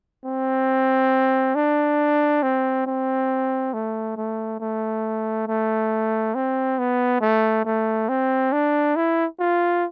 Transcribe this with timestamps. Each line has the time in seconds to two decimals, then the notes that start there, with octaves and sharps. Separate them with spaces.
0.25 C4
1.55 D4
2.43 C4
2.86 C4
3.74 A3
4.17 A3
4.60 A3
5.48 A3
6.35 C4
6.79 B3
7.21 A3
7.65 A3
8.09 C4
8.52 D4
8.96 E4
9.39 F4